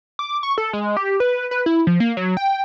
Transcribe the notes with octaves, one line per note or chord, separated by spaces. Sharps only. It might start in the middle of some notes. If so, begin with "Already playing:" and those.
D6
C#6
A4
G#3
G4
B4
B4
E4
F3
A#3
F#3
G5